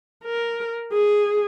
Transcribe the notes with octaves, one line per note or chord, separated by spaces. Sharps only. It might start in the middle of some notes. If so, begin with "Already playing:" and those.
A#4
G#4